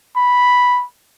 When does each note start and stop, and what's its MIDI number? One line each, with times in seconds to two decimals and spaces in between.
0.17 0.84 83